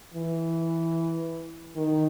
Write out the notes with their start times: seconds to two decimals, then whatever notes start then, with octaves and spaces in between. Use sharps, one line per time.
0.14 E3
1.76 D#3